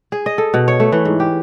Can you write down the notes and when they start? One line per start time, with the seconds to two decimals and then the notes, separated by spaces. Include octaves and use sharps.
0.12 G#4
0.26 D#5
0.38 A4
0.54 B2
0.68 C#5
0.80 A3
0.92 E3
1.05 G#2
1.20 G4